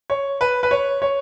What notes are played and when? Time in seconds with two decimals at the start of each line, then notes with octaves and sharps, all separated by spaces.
0.10 C#5
0.41 B4
0.63 B4
0.71 C#5
1.02 C#5